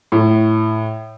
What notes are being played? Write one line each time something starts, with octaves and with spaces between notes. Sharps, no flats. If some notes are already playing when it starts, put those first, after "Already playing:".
A2